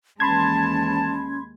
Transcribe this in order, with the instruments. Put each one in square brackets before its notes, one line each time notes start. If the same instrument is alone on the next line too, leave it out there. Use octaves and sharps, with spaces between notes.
[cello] D#2 G#3 [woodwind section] E3 A5 [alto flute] C#4 [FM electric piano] B5 C6 G#6